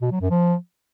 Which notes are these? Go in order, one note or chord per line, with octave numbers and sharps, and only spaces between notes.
B2
F#3
F#2
F3